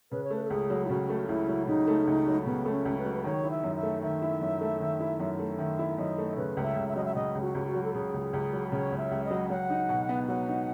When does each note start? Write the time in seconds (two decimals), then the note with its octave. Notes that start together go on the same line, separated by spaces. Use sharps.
0.12 C#3 B4
0.24 C#5
0.31 A3 B4
0.44 A4
0.50 C#2 G#4
0.70 F#3
0.85 E4
0.89 C#3 F#4
1.09 A3
1.28 C#2 E4
1.48 F#3
1.67 C#3 D#4
1.87 A3
2.07 C#2
2.27 F#3
2.46 C#3 B3
2.65 A3
2.72 C#4
2.85 C#2
2.99 B4
3.05 F#3
3.14 B4
3.24 D#3 C#5
3.44 E4
3.50 E5
3.63 F#2
3.76 E5
3.83 A3
4.02 D#3 E5
4.22 E4
4.42 F#2
4.61 A3
4.80 D#3
5.00 E4
5.20 F#2
5.39 A3
5.58 D#3 E5
5.79 E4
5.98 F#2 D#5
6.18 A3
6.37 C#3 B4
6.57 C#2
6.63 E5
6.76 C#2
6.89 E5
6.96 F#3 D#5
7.05 E5
7.15 C#3 D#5
7.35 C#2
7.41 F#4
7.55 C#2
7.67 F#4
7.75 F#3
7.83 A4
7.94 C#3 G#4
8.14 C#2
8.33 C#2
8.53 F#3
8.72 C#3 C#5
8.92 C#2
8.98 E5
9.11 C#2
9.25 D#5
9.30 F#3
9.50 F#3 F#5
9.70 D#4
9.89 B2
10.09 B3
10.28 F#3 F#5
10.48 D#4